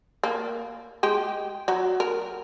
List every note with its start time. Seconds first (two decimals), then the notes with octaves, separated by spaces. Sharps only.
0.24 A#3
1.03 G#3 G4
1.68 F#3
2.00 A#4